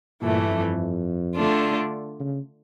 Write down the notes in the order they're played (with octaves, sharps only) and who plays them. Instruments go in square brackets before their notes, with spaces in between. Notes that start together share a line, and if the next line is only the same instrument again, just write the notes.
[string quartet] G2 E3 A3 [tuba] A#2
[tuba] F2
[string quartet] D3 A3 D4 F4
[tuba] C#3